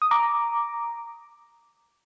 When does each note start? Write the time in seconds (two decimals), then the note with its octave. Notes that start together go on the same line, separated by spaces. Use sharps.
0.02 D#6
0.11 A#5 D6